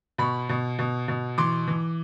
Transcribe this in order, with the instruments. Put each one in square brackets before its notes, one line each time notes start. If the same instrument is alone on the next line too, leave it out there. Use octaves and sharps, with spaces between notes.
[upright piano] B2 B5 C#6
B2
B2
B2
E3 C6 D6
E3